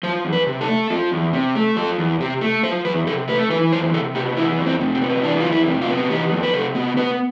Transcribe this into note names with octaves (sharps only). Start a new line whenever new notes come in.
F3 C5
E2
B4
C3
A4
A3
F3
E2
C3
A3
F3 A4
E2
C3 G4
A3
F3 C5
E2 B4
C3 A4
A3 B4
E3 B4
F2 C5
C3 A4
B3 G4
E3 E4
F2
C4
C3
C4
B3
E3 D4
F2 F4
E4
C3
F4
B3
E3 G4
F2
B4
C3 A4
B3
B3 B4